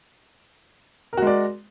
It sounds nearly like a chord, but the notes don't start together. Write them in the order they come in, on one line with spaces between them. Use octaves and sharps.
A#4 F#4 G#3 D5